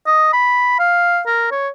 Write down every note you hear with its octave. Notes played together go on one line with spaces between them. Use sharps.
D#5
B5
F5
A#4
C#5